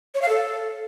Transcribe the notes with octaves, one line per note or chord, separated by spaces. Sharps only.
C#5
F5
A4